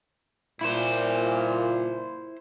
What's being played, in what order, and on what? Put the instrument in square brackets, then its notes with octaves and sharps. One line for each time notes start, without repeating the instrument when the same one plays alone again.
[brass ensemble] A#2 [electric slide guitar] E4 C5